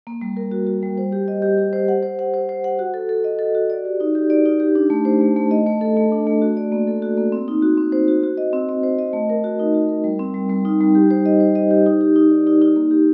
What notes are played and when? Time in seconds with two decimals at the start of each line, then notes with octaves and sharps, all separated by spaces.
0.07 A#3
0.21 G3
0.37 A#4
0.52 F#4
0.67 F#4
0.83 G3
0.98 C5
1.12 G4
1.28 D#5
1.42 G4
1.58 G4
1.73 C5
1.88 F#5
2.03 C5
2.19 F#5
2.34 C5
2.49 C5
2.64 F#5
2.79 F#4
2.94 A4
3.09 A4
3.24 D#5
3.39 A4
3.55 F#4
3.70 D5
3.85 G4
4.00 D#4
4.15 G4
4.30 D5
4.46 D#4
4.60 G4
4.75 D4
4.90 A3
5.05 C5
5.21 A3
5.36 A3
5.51 D#5
5.67 A3
5.81 A4
5.97 A3
6.12 D4
6.27 A3
6.42 F#4
6.57 D5
6.72 A#3
6.87 A4
7.02 F#4
7.17 A#3
7.32 C4
7.48 D#4
7.62 F#4
7.77 C4
7.92 C5
8.08 F#4
8.24 F#4
8.38 D#5
8.53 C4
8.69 C4
8.83 C5
8.99 D#5
9.13 A3
9.29 A#4
9.44 F#4
9.60 D#4
9.74 F#4
9.89 A#4
10.04 G3
10.19 C4
10.34 G3
10.49 G3
10.65 D#4
10.80 G3
10.95 G4
11.11 C5
11.26 D#5
11.40 C5
11.55 D#5
11.71 G4
11.86 D#4
12.01 G4
12.16 D#4
12.31 D5
12.47 D#4
12.62 D#4
12.76 A#3
12.91 G4